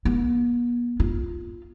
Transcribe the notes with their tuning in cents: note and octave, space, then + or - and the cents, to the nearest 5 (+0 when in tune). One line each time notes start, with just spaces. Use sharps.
B3 -45
F4 -5